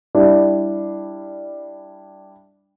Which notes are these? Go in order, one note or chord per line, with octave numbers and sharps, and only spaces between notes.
G3 D4 E4